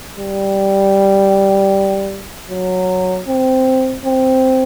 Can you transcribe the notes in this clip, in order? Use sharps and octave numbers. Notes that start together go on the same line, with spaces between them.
G3
F#3
C4
C4